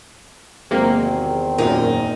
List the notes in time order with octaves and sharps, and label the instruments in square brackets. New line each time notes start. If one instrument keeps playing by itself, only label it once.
[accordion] E2 D#3 C4 [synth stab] C3 A#3 [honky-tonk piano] F#3 G#3 D#4
[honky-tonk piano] A#1 A#4 [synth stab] F#2 A#2 [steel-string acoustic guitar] D#4